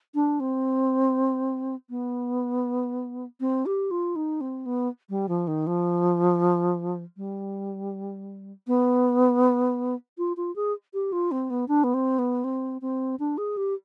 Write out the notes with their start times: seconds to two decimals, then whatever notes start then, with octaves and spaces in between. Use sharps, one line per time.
0.15 D4
0.40 C4
1.90 B3
3.40 C4
3.66 G4
3.91 F4
4.16 D#4
4.41 C4
4.66 B3
5.09 G3
5.29 F3
5.47 D#3
5.67 F3
7.17 G3
8.67 B3
10.18 F4
10.37 F4
10.56 G#4
10.94 G4
11.12 F4
11.31 C4
11.50 B3
11.68 D4
11.84 B3
11.94 C4
12.19 B3
12.44 C4
12.82 C4
13.19 D4
13.38 G#4
13.57 G4